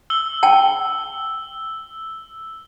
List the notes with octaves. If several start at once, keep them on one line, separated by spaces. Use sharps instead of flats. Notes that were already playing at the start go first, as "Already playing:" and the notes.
E6 G7
G5 A5